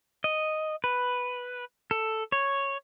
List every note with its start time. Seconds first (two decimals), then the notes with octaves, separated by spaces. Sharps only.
0.24 D#5
0.84 B4
1.91 A4
2.32 C#5